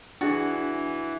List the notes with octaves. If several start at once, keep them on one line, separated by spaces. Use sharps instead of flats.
E3 D4 F#4 G#4 A6